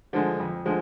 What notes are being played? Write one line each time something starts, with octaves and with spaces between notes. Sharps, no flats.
D3 F3 G#3
F2
D3 F3 G#3